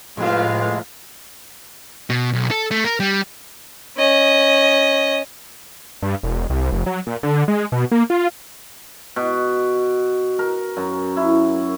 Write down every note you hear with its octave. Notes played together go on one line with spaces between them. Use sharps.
F2 A2 C3 G#3 F4 B4 F5
B2
B1
A4
A3
A#4
G3
C#4 D#5
G2
E1
C2
F1
F#3
A#2
D3
G#3
B2
A#3
F4
B2
A#4
F#2
E4